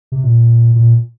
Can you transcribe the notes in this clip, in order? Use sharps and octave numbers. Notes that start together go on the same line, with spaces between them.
C3
A#2
A#2